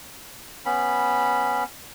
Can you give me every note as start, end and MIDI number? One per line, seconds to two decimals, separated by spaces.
0.66 1.64 59
0.66 1.64 61
0.66 1.64 83